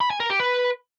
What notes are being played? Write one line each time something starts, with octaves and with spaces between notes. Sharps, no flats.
B5
G#5
A#4
G4
B4